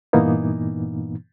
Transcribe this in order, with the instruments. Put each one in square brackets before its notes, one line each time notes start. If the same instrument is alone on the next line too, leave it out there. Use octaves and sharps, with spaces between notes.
[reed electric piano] G2 A#2 E3 A#3 B3 D#4